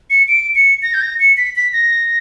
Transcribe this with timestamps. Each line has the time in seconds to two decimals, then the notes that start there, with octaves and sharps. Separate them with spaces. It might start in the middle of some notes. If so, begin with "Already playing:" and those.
0.10 C#7
0.28 D7
0.55 C#7
0.82 A#6
0.94 G6
1.02 A#6
1.20 C#7
1.37 B6
1.56 B6
1.73 A#6